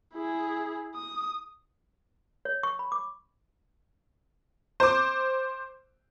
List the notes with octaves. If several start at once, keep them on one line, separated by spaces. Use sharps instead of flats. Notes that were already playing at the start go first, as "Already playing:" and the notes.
E4 G#4
D#6
C#5
C#6
B5
D6
C5 D6